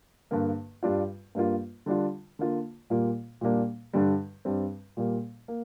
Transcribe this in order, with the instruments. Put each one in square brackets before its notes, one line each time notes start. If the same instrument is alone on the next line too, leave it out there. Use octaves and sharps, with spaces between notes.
[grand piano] G2 D3 A#3
G2 G3 D4 F4
G2 G3 A#3 F4
D3 G3 D4 F4
D3 A#3 F4
A#2 G3 A#3 F4
A#2 G3 A#3 D4
G2 D3 G3
G2 G3 C4
A#2 G3 A#3
A#3